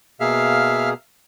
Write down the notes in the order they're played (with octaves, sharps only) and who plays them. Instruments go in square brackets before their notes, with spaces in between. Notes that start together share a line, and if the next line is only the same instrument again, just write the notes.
[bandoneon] B2 A#3 G#4 [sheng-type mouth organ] E5 F5 F6